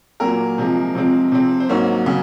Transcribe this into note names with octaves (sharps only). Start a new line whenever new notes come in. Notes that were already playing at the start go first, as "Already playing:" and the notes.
A#2 F#3 A#3 A#4
C3 F3 G#3
C3 F3 G#3 C4
C3 F3 C4
C5
G#2 F#3 A#3 C#5
C#3 F#3